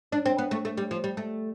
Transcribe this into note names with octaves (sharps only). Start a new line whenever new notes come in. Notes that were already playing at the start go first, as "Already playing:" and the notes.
D4
C4
B3
A3
A3
G3
F3
G3
A3